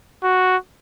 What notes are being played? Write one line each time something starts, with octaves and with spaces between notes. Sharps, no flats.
F#4